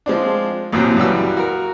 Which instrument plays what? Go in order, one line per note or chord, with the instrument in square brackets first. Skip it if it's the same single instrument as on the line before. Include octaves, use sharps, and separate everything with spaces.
[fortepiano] F3 G#3 C4 D4
A#1 F#2 A2 C3 F#3
F#2 C#3 E3 G3 F#4 E6
F#4 A#4